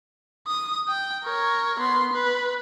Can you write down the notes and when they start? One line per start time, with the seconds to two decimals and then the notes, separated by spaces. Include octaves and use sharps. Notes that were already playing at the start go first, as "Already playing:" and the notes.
0.47 D#6
0.88 G5
1.24 A#4 C#5
1.79 B3 C6
2.13 B4